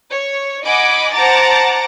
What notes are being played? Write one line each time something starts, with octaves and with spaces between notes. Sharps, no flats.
C#5
D#5 F#5 G#5 B5 D6
C5 F#5 A5 A#5 D6 A6